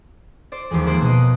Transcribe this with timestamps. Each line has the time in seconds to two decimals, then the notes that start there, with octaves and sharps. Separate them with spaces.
0.52 C5 D5
0.71 D#2 E3 F3 G#3
0.86 F3 A#3 C5 C6 F#6 D7
1.01 B2 D#5